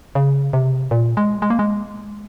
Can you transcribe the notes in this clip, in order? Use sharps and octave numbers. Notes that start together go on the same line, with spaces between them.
C#3
C3
A#2
G#3
G#3
A#3
G#3